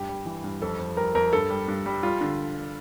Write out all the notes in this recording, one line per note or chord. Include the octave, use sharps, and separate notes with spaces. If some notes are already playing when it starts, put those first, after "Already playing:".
Already playing: G2 G4
G3
E3
G2
F2 A4
F2
G3 A#4
F2 A#4
G2 A4
G3
G2
G3
G3 F4
D3